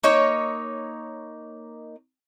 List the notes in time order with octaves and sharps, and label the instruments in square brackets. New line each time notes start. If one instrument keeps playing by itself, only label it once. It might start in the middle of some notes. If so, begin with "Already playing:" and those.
[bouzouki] A#3 D#4 C#5